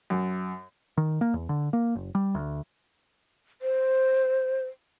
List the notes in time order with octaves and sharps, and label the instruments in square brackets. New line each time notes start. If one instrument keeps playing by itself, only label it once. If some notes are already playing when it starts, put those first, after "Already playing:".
[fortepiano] F#2
[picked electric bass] D#3
A#3
E2
D3
A#3
F#1
G3
D2
[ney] C5